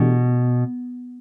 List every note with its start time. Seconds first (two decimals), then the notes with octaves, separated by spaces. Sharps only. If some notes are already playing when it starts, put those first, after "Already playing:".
Already playing: B2 E3 A3 D4 G4